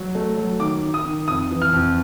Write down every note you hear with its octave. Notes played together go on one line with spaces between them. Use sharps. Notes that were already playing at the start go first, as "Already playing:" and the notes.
Already playing: F#3
A3
F#3
D#3 D6
D#3
D#6
D#3
F2 D#6
E3
F6
F2